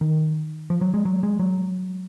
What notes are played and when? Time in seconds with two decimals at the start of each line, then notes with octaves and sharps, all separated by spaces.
0.01 D#3
0.70 F3
0.81 F#3
0.94 G#3
1.05 F#3
1.23 G#3
1.40 F#3